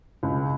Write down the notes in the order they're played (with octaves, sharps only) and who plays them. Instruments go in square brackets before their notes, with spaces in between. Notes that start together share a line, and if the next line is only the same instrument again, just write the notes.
[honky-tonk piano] C#2